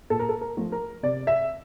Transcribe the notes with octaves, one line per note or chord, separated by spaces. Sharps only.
A#2 A4
A#4
A4
A#4
F3 A3
A#4
C3 D5
E5